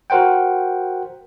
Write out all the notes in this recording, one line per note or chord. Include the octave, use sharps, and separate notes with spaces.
F#4 A#4 C5 F#5 G5